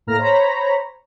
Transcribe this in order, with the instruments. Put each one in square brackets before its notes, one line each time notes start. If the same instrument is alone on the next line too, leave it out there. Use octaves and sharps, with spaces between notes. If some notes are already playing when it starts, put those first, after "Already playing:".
[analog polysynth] A2 A#3 A#5 F6 A#6
C5 C#5 A#5 B5